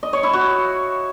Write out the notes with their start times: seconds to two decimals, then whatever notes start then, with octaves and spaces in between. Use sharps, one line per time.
0.03 D#5
0.13 C#5
0.23 E4
0.33 F#4